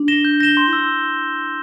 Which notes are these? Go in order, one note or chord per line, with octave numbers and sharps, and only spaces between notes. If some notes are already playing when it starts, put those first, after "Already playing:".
Already playing: D4
A#6 E7 G7
G6
A#6 E7 G7
C6
E4
E6